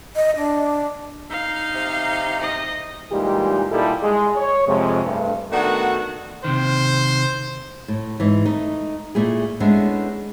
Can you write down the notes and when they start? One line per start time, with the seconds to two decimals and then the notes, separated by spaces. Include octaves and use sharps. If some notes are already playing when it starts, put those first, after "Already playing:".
0.16 D#5
0.37 D4
1.31 D#4 F5
1.75 C3
2.41 D#5
3.11 A#2 E3 G3 G#3 D#4 G4
3.70 A#2 G3 D#4 E4 A4
4.02 G#3
4.36 C#5
4.66 F2 C3 G#3
5.05 G2 A3
5.51 D#3 A3 B3 D4 F#4
6.44 C3 D#3 C5
7.88 A2
8.20 G#2 E3
8.46 A3 D#4 D#5
9.15 A#2 A3 E4 G#4
9.60 G#3 A3 B3 C#4 D4 E4